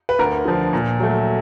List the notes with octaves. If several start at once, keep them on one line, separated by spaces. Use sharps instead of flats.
B4
D2 A#4
D3 F3
A#2
F#3 A3